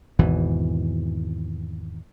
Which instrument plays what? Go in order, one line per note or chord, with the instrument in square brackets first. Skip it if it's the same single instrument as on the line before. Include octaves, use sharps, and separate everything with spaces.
[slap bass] G#1 E2 B2 E3